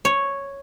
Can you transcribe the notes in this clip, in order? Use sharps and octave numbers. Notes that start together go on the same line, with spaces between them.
C#5